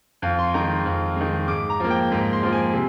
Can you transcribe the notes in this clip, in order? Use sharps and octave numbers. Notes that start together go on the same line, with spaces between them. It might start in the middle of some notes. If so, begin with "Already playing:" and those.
F2 F5
C6
D#3 G#3 A#5
F2
D#3 G#3
G#2 D6
A#5
F3 A#3
G5
G#2
C6
F3 A#3
G#5
C3